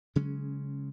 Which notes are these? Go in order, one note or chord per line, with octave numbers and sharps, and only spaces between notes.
C#3 F#3 G#3 C#4